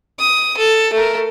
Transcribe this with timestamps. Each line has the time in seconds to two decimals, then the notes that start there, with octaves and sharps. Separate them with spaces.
0.20 D#6
0.57 A4
0.93 A3 A#4